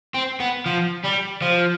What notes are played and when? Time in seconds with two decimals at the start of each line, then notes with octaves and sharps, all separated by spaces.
0.15 C4
0.40 B3
0.66 F3
1.04 G3
1.42 F3